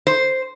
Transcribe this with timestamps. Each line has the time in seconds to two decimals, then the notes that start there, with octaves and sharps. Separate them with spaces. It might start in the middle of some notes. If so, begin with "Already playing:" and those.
0.07 C5